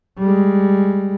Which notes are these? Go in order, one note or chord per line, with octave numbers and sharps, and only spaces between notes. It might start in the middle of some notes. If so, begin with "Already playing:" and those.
G3 G#3